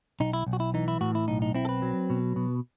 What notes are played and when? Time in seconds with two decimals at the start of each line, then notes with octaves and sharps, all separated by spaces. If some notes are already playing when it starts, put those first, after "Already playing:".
0.20 B1 D#4
0.33 E4
0.46 B1
0.53 F#4
0.60 E4
0.74 E3 D#4
0.88 E4
1.01 A2 F#4
1.15 E4
1.28 B1 D#4
1.42 D#4
1.55 C4 E4
1.65 A4
1.69 B4
1.82 F#3
2.10 B2
2.36 B2